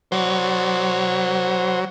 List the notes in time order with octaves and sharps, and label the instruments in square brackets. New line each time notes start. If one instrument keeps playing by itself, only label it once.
[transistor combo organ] F#3 [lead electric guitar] C5 D5